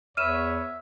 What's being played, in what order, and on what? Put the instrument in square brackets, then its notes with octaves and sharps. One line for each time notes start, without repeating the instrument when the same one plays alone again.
[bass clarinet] E2 [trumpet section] B4 C#5 [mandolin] E5 [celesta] F6 D#7 E7